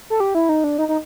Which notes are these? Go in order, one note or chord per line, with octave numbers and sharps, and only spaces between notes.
A4
G4
E4
D#4
D4
D#4
D#4